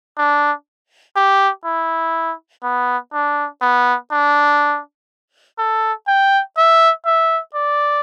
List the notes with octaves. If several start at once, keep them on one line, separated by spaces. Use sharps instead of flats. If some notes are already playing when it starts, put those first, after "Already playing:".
D4
G4
E4
B3
D4
B3
D4
A4
G5
E5
E5
D5